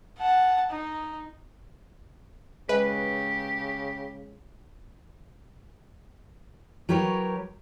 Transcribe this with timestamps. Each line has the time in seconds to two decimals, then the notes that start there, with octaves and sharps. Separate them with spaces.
0.19 F#5 A5
0.71 D#4
2.69 C#3 G#3 G4 B4
6.89 F#3 G4 A#4 B4 C#5